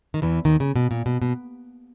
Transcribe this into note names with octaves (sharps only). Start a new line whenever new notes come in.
D#3
E2 E3
D#2 D#3
C#3
B2
A#2
B2
B2